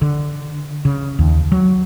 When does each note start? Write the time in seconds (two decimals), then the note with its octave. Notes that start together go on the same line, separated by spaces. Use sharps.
0.02 D3
0.85 C#3
1.19 D#2
1.52 F#3